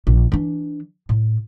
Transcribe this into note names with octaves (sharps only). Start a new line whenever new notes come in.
A#1
E3 D4
A2